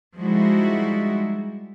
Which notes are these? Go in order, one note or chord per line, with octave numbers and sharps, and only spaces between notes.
F3 G3 G#3 D#4 E4 F#4